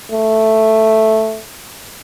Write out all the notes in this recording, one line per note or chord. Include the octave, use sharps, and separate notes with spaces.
A3